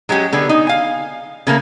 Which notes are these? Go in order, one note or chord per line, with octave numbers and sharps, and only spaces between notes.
F#3 G#3 C#4 G4
D3 B3 G#4
D#4
F5 G#5
C#3 A3 A#3